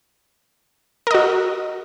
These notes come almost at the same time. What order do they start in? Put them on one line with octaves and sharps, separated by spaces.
A#4 D#5 F#4